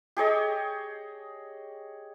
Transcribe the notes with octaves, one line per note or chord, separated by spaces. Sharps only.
G4 G#4 C#5 D#5